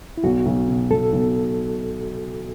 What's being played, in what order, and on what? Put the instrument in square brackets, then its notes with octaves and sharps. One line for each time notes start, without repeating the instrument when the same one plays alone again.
[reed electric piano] E4
[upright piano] B1 [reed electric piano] F#4
[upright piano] B1
B2
[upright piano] B1 [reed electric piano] A4
[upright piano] B1